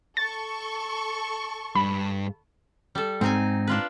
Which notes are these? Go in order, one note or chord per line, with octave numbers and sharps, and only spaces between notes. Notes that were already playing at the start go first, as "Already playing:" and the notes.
A4 C#6 A6
G2 B5
G3 A4
G#2 C4 D#4 G#5
D4 F4 B4